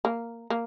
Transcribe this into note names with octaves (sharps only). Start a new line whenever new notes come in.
A#3
A#3